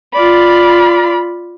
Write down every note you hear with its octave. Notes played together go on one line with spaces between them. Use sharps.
F4 D5 B5